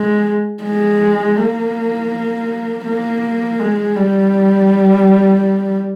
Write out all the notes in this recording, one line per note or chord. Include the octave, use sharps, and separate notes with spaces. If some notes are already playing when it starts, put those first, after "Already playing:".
Already playing: G#3
G#3
A#3
A#3
G#3
G3